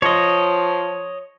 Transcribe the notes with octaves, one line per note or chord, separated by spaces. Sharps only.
F3 C#5 D#5